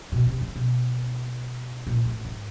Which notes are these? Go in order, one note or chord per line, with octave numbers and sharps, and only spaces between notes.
B2
C3
C#3
B2
A#2
A2
G#2